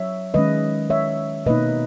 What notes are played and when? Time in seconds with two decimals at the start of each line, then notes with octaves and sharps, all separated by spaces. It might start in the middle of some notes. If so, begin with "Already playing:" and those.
Already playing: F#3 C#5 E5
0.34 D#3 G#3 C#4 B4 D#5
0.90 C#5 E5
1.46 B2 A#3 D#4 B4 D#5